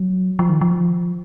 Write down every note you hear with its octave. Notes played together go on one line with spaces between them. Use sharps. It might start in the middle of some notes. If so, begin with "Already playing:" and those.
Already playing: F#3
F3
D#3
F3